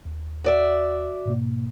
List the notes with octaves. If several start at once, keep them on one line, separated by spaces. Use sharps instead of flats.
D#2
F#4 D5 E5
G#2 B2 A#3